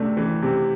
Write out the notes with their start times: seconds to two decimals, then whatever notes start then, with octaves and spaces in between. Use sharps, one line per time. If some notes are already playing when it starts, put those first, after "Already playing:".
Already playing: C3 A3 D4
0.17 E3
0.42 C3